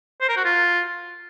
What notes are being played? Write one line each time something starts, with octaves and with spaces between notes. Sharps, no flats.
C5
A#4
F#4
F4